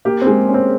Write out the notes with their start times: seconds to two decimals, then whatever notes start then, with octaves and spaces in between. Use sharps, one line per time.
0.05 A#3 G4
0.22 C4
0.27 G#3
0.49 C#4
0.54 C4